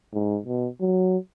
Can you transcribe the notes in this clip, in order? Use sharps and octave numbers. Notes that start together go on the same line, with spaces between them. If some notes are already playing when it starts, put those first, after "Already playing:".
G#2
B2
F#3